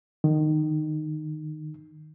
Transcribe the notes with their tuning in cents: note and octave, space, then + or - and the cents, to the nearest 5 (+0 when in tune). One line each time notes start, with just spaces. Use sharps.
D#3 -15